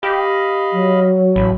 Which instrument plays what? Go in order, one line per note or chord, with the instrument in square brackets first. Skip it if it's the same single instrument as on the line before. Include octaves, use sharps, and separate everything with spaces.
[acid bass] G4 [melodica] D#5 F5 B5
[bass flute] F#3
[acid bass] A1 [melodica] B5